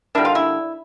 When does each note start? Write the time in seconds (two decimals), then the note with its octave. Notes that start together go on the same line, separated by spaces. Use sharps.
0.15 D3 G3 A#3 D4 E4 E5
0.25 F4 F5
0.35 E4 E5